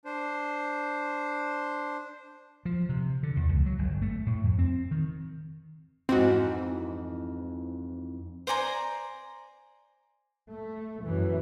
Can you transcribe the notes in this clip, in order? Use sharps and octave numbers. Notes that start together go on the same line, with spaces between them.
D4 C5
F3
C3
D3
E2
C#2
F#3
G1
A3
A2
F2
C4
D#3
F2 G#2 E3 C4 F#4
C5 D5 G#5 A#5
A3
F#2 E3